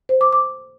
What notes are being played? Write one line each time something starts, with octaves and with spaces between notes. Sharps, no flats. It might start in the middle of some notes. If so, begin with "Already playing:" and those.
C5
D6
D6